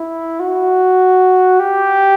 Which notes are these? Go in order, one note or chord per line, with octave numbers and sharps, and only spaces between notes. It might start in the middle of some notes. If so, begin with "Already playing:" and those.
Already playing: E4
F#4
G4